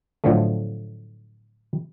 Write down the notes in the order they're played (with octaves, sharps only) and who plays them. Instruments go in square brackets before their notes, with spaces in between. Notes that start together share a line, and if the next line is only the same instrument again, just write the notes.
[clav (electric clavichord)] A2 D3 F3 F#3 A3